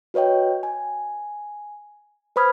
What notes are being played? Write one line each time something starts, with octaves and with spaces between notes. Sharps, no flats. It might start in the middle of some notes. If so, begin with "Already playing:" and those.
F#4 B4 C#5 D#5 G5
G#5
B4 C5 B5 D#6 F6 G#6